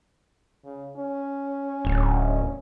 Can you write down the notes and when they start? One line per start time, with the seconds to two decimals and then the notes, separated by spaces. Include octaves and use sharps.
0.65 C#3
0.97 C#4
1.85 D1